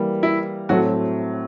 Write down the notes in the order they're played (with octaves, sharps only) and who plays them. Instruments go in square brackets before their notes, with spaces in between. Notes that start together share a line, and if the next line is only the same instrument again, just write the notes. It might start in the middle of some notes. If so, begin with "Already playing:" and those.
Already playing: [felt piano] E3 G3 A#3
[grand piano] E4
[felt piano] A2 F#3 A3 C4 [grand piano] F#4